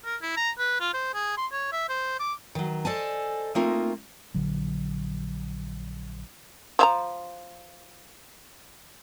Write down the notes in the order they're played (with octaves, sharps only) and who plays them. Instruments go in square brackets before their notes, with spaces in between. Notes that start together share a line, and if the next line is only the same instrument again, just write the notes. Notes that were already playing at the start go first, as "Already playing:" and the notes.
[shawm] A#4
E4
A#5
B4
F4
C5
G#4
C6
C#5
E5
C5
D6
[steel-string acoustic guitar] D#3 F#3
A4 C5 D5 D#5 G#5 A5
A3 A#3 C4 D#4 F4 A#4
[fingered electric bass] A#1 D3 F#3
[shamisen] F3 E5 A#5